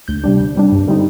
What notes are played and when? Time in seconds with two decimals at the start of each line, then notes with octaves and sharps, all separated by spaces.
0.08 D2 G6
0.24 C3 G3 D4
0.40 D2
0.56 C3 G3 D4
0.72 G2
0.87 D3 G3 C4 D#4